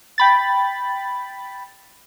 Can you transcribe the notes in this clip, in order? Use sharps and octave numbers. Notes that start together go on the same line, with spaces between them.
G5 B5 A6